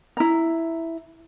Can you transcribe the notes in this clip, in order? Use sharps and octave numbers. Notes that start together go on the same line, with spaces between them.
E4 A#5